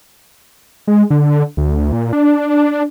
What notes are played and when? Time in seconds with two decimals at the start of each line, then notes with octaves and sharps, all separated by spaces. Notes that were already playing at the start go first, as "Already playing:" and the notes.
0.87 G#3
1.10 D3
1.57 D2
1.93 A#2
2.13 D4